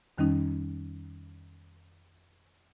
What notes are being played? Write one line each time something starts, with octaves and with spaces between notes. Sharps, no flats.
F2 D#3 G3 C#4 D#4